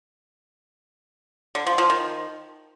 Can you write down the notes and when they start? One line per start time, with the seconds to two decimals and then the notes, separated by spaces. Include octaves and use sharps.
1.55 D3
1.67 F3
1.78 F3
1.90 D#3